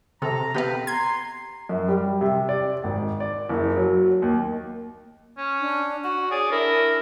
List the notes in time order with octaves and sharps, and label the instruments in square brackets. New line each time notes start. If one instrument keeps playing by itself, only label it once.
[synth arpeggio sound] C3 [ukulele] A4 [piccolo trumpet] A#5
[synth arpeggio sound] C3 B3 F5 [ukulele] G4 [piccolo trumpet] B4
[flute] A#5 [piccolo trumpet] C6 [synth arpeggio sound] G#6
[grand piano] F#2
G3
C3
D5
G#1
D5
F#1
F#3
D#2
[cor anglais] C#4
[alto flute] D4
[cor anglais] F#4 [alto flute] F#5
[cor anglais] G#4 [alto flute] C#5 [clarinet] D5
[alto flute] D4 [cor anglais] E4 [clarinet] A#4